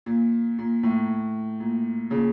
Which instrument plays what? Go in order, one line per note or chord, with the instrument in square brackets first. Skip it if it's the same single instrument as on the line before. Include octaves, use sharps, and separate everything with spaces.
[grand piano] A#2
A#2
A2
A#2
A#2 C#3